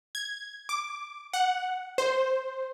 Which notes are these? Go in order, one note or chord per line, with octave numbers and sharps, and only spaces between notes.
G#6
D6
F#5
C5